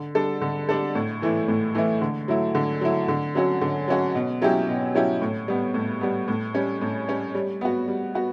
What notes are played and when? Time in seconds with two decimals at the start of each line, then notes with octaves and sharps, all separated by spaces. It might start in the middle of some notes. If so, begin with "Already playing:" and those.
Already playing: D3
0.15 G3 D4 A4
0.41 D3
0.69 G3 D4 A4
0.95 A2
1.22 E3 A3 E4
1.48 A2
1.75 E3 A3 E4
2.01 D3
2.28 F#3 A3 E4
2.55 D3
2.81 F#3 A3 E4
3.08 D3
3.35 F#3 C#4 F#4
3.61 D3
3.88 F#3 C#4 F#4
4.15 B2
4.42 F#3 C#4 E4 G4
4.68 B2
4.95 F#3 C#4 E4 G4
5.22 A2
5.48 G3 B3
5.74 A2
6.01 G3 B3
6.28 A2
6.55 G3 C#4
6.81 A2
7.08 G3 C#4
7.35 G3
7.61 B3 F#4
7.88 G3
8.15 B3 F#4